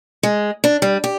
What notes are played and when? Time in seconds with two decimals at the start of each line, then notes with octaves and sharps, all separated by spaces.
0.23 G#3
0.64 D4
0.82 G3
1.04 G4